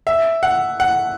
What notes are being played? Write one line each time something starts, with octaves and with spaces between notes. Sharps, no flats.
E5
F#5
F#5